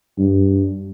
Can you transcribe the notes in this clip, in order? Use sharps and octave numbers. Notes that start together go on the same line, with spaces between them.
G2